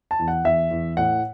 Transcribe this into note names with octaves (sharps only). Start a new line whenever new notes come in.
A5
E2
F#5
E2 E5
E2
A2 F#5